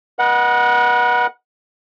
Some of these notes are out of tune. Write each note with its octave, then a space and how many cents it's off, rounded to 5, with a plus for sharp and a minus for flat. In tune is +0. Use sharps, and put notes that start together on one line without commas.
B4 -40 D#5 +0 F#5 +0